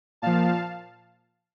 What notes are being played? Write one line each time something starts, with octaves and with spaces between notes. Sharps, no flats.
A#2 F3 F5 A5